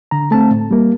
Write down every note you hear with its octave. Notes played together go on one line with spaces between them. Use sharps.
D3 A#5
A3 C4 A5
A2
G3 A#3